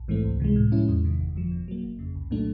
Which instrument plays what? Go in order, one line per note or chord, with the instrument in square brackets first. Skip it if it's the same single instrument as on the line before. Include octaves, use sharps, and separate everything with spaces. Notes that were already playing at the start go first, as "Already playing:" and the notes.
Already playing: [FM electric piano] A#1
G#2 E3 A3 C4
C#2
C3 E3 G#3
A2
F3 G#3 C#4 E4
E2
C3 D#3
G1
F2 D3 F3
B2
F#3 A#3
G1
F2 C#3
C2
A#2 F#3 A3 D4